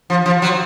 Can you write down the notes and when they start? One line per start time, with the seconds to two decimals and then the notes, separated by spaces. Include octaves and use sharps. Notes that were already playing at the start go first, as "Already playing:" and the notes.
0.10 F3
0.26 F3
0.42 F#3